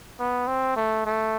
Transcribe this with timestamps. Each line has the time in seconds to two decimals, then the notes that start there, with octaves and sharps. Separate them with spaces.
0.20 B3
0.47 C4
0.77 A3
1.06 A3